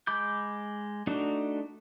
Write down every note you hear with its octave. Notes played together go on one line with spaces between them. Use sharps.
G#3 B5 D6 G6
A3 D4 D#4 F#4